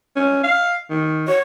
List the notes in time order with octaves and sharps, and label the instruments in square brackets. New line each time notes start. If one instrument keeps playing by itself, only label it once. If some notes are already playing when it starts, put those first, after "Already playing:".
[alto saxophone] C#4
F5
D#3
[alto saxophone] F#4 [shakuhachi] C#5